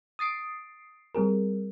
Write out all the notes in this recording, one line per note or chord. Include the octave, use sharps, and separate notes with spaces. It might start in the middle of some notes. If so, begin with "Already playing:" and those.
D#6 A6 C7 D7
G3 C4 G#4 A#4